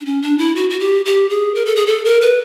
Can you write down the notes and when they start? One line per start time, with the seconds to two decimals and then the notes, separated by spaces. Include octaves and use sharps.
0.01 D4
0.05 C#4
0.22 D4
0.38 E4
0.55 F#4
0.70 F#4
0.80 G4
1.05 G4
1.29 G#4
1.55 A#4
1.66 A4
1.76 G#4
1.87 A4
2.05 A#4
2.21 B4